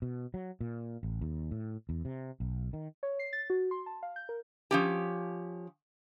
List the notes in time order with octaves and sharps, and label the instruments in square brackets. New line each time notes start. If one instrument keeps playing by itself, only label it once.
[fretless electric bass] B2
F#3
A#2
A1
D#2
A2
E2
C3
B1
D#3
[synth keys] C#5
C7
A6
F#4
C6
A5
F5
G6
A#4
[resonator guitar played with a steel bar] F3 C#4 G4